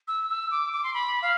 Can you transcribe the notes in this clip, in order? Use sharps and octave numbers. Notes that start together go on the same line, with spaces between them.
E6
E6
D6
D6
C6
B5
F5